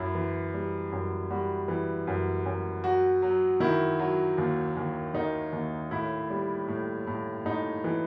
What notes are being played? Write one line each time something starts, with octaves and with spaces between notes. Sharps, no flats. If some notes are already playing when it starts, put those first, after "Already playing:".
Already playing: F#2 E4
E3
G3
F#2
G3 F#4
E3
F#2
F#2
F#3 F#4
F#3
D#3 E4
F#3
D#2
D#2
D#3 D#4
D#2
A2 E4
G3
A2
A2
A2 D#4
E3